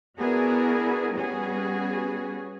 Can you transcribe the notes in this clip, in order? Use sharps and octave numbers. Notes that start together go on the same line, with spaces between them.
B3 D4 E4 F#4 G#4 A#4
G3 B3 C#4 F#4 G#4